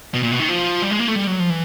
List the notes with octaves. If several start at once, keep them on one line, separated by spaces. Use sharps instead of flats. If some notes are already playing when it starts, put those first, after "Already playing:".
B2
A#2
B2
D#3
F3
G3
G#3
A#3
A3
G3
F#3
F3
E3